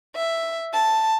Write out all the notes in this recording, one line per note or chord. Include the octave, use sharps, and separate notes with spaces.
E5
A5